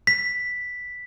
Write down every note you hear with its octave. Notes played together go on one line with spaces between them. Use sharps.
B6